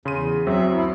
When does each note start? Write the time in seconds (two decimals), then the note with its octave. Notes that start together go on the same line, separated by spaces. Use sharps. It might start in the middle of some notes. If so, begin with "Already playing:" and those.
0.05 E2 C#3 C6 D#7
0.47 F#2 F#3 C4 E5
0.72 D2 E4